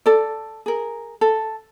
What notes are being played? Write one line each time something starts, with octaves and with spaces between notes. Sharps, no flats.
A4 D5
G#4 A#4
A4